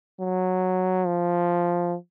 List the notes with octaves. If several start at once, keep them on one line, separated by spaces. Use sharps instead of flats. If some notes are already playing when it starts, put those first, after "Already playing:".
F#3
F3